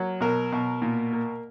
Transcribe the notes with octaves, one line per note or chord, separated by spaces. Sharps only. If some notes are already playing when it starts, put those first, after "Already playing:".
Already playing: F#3 A#3
B2 A#4
B2
A#2
A#3